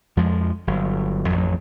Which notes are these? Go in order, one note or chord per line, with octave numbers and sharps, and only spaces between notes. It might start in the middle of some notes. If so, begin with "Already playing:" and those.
F2 F3 G#3
G1 F#3
A1 F2 F#3